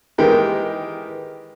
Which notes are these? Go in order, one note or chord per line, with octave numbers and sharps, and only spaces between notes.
D#3 E3 G#3 G4 A#4